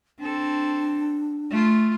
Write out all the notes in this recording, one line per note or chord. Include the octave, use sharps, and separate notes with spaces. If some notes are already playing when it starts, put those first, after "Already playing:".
C4 D4 A4
A3 F4